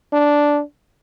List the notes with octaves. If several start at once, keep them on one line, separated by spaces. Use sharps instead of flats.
D4